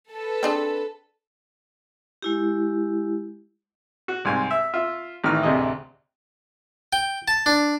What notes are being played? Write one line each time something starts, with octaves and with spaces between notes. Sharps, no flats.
A4 B4
C4 D4 G#4
G#3 E4 G4
F#4
C2 G#2 G#5
E5
F4 E5
A1 D#3 E3 B4 F6
A1 D2 C3 G#4 D#5
G5
A5
D4